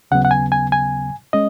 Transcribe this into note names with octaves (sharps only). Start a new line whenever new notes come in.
D#2 C#3 F#3 B3 F#5
F#5
G#5
G#5
G#5
G#3 C#4 D#5